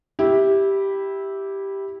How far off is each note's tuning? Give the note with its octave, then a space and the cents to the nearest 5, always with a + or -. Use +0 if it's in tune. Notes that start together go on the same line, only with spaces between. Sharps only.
E4 -10 G4 +0